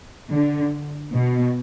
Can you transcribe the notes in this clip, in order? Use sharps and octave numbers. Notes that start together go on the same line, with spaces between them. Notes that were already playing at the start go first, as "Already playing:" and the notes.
D3
B2